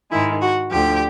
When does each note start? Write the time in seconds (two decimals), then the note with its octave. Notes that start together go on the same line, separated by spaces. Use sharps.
0.11 G#2 D#3 G#3 E4
0.41 F#4
0.70 D2 D3 F3 G4